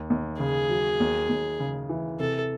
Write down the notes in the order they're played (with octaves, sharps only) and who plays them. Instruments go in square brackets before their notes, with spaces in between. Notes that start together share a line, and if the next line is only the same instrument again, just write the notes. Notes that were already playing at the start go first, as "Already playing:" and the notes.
Already playing: [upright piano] D#2
D#2
[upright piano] C#3 [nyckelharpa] G#4
[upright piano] F#3
D#2
D#2
C#3
E3
[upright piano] C3 [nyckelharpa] A4